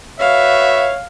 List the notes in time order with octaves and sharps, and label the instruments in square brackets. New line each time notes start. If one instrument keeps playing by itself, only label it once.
[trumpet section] F#4 B4 E5 [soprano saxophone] C#5 [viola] F5